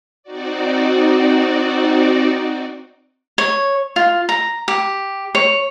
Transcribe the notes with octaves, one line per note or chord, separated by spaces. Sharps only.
C4 D#4 F#4 D5
C#5
F4
A#5
G4
C#5